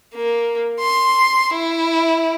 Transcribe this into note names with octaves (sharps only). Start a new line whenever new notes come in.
A#3
C6
E4